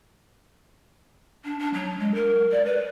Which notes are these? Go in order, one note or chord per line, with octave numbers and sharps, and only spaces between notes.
D4
D4
F#3
G#3
A#4
D5
B4